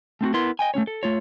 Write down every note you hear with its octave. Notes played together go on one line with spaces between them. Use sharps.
A3 C4 D4 F#4
B3 E4 A#4 C6
D#5 G5 G#5
A3 C4 C#4 C#5
A4
A3 F4 C#5